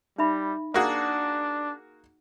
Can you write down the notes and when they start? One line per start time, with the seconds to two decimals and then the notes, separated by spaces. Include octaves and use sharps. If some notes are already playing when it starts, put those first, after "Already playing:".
0.18 G3 D#4 E5 B5
0.74 A#3 D4 F#4 G#4